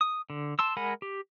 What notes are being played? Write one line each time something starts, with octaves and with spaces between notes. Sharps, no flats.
D#6
D3
A5 C6 E6
G#3 A#4 F#5 G#5 B5
G4